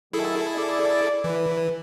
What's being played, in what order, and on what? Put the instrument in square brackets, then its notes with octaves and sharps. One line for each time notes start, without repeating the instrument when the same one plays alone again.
[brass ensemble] D#3 F#3 A3 [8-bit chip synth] E4 G#4 A4
[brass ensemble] D5
[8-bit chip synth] E3 [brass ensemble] B4